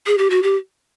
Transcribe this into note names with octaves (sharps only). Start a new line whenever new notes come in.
G#4
G4
F#4
G4